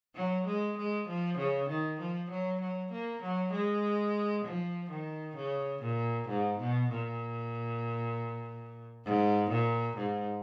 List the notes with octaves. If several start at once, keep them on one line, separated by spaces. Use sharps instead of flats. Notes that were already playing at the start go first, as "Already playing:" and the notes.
F#3
G#3
G#3
F3
C#3
D#3
F3
F#3
F#3
A#3
F#3
G#3
F3
D#3
C#3
A#2
G#2
B2
A#2
G#2
A#2
G#2